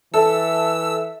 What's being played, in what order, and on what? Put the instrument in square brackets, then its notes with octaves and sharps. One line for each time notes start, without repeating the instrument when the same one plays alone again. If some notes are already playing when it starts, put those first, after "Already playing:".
[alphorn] E3 [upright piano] A4 A5 [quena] E5 [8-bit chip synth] E6